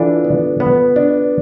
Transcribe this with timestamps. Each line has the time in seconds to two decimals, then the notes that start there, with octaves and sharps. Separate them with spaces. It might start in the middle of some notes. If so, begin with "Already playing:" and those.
Already playing: E3 D4 F4 A4
0.25 B3
0.60 B3
0.96 D4